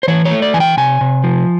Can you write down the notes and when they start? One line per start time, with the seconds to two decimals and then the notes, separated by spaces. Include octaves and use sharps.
0.03 C5
0.08 E3 C#5
0.25 C#5
0.31 A3
0.42 D5
0.54 E3 G#5
0.60 G5
0.77 C3 G#5
1.01 C3
1.24 F3